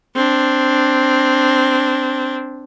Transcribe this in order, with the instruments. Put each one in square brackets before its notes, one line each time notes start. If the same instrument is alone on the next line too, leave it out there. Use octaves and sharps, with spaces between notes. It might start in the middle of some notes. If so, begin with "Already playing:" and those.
[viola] C4 D4